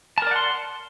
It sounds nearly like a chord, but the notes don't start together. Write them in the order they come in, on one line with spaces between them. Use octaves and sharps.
A5 A#4 D5 F#5 C6